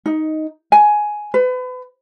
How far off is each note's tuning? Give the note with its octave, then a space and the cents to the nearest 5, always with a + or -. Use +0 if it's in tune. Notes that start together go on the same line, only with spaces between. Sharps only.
D#4 +5
G#5 +10
B4 +35